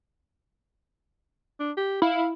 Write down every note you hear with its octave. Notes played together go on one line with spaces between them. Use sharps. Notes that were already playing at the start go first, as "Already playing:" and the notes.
D4
G4
E4 F5